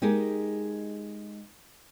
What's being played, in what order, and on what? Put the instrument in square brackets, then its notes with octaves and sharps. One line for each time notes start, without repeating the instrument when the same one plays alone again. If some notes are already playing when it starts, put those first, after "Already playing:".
[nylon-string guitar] G#3 D#4 G4 G#4 A#4